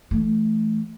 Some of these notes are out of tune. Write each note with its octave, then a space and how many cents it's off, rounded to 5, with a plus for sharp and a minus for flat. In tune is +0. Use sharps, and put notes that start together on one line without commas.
E3 +20 A3 -15